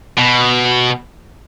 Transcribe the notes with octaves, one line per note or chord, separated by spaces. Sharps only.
B2